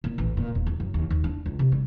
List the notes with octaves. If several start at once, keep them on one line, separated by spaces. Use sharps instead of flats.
A#2
A1
A#2
D#1
D#2
F#2
D#2
D#2
D4
C#2
C3
G3